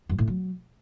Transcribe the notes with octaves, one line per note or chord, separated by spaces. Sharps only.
F#2
A2
F#3